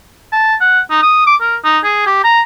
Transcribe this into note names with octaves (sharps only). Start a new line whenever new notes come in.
A5
F#5
D#4
D#6
D6
A#4
D#4
G#4
G4
A#5